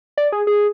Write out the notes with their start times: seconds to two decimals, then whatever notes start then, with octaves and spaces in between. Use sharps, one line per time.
0.18 D5
0.32 G#4
0.47 G#4